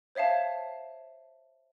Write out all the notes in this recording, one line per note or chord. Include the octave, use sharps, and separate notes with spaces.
C5 C#5 E5 F5 A5